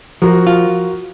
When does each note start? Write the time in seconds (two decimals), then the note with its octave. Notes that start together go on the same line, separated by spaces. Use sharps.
0.22 F3 F#4 A#4
0.47 F4